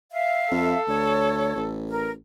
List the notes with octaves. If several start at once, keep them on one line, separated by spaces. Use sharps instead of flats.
E5 F5
F2 A4
D2 C#5
A1
A#4